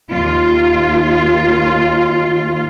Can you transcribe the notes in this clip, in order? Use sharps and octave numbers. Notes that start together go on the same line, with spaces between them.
D#2 F4